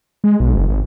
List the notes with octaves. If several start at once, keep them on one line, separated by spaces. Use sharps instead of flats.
G#3
B1
F#1
G#1